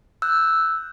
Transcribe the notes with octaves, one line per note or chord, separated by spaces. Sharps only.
E6 F#6 G6